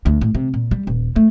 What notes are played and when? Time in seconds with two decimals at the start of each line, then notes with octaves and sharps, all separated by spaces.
0.06 D2
0.21 A2
0.35 C3
0.54 A#2
0.71 G3
0.87 D#1
1.16 A3